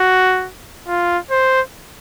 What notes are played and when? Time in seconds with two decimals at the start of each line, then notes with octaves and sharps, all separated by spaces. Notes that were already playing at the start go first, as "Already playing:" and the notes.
Already playing: F#4
0.88 F4
1.31 C5